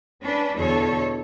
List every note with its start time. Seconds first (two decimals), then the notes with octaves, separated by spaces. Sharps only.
0.21 C#4 D4 B4
0.55 E2 B2 D3 A4 C#5